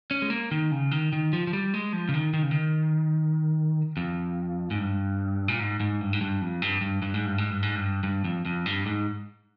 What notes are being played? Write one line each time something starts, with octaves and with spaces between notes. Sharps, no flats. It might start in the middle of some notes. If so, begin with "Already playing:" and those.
C#4
G#3
A#3
D#3
C#3
D#3
D#3
F3
F3
G3
G#3
F3
C#3
D#3
D#3
C#3
D#3
F2
G#2
G2
A#2
G#2
G#2
G2
G#2
G2
F2
G2
G2
G2
G#2
G2
G#2
G2
G#2
G2
G2
F2
F2
G2
G#2